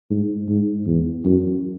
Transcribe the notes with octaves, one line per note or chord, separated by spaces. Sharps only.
G#2
G#2
E2
F#2